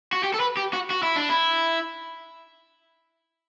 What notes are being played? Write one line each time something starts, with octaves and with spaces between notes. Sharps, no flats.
F#4
G4
A4
B4
G4
F#4
F#4
E4
D4
E4